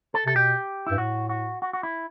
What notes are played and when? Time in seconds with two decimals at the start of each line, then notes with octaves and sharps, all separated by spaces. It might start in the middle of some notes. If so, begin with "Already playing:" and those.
0.14 A4
0.26 C3 A4
0.36 B2 G4
0.87 G2 E4
0.98 A2 F#4
1.29 F#4
1.62 F#4
1.73 F#4
1.83 E4